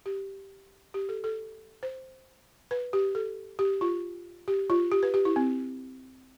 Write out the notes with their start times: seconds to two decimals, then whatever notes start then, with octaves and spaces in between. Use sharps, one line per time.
0.06 G4
0.94 G4
1.09 A4
1.24 A4
1.83 C5
2.71 B4
2.93 G4
3.15 A4
3.59 G4
3.81 F4
4.48 G4
4.70 F4
4.92 G4
5.03 B4
5.14 G4
5.25 E4
5.36 C4